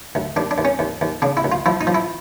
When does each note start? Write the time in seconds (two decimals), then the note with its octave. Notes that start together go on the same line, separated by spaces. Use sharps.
0.15 D2
0.36 D#2 D4
0.51 D4
0.58 D#2
0.65 C#4
0.79 D#2
1.01 D#2
1.22 C#3 D4
1.37 E4
1.44 D2
1.52 F4
1.66 F3 E4
1.81 D#4
1.87 F3
1.94 E4